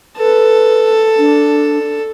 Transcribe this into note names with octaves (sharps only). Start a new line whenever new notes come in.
A4 B4
D4